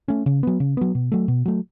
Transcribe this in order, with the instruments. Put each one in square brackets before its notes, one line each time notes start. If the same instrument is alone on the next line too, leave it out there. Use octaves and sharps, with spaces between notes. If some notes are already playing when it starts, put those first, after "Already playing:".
[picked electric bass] A3 C#4
C#3
F#3 B3
C#3
F#3 B3
B2
F#3 A3
B2
F#3 A3